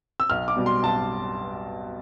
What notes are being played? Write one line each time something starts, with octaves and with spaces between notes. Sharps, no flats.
E6
B1 F6
D6
B2 G3
C6
B1 A5